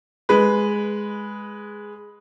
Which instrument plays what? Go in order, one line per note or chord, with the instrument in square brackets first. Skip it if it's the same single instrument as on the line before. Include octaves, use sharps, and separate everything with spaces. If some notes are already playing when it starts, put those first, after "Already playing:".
[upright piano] G#3 B4